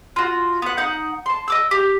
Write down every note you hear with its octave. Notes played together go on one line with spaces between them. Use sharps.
F4 F#4
B3 F#5
D#4 F#5 G6
A5 C6
D#5 D6 E6
G4